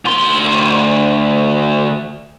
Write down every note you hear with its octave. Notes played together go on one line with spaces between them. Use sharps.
D2 C6